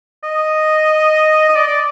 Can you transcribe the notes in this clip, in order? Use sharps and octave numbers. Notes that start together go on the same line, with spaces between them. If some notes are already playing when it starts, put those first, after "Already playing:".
D#5
D#5
D5
D5